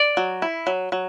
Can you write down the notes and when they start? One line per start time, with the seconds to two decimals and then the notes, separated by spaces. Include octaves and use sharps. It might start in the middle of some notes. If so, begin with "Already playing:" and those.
Already playing: D5
0.17 F#3
0.42 E4
0.67 F#3
0.92 F#3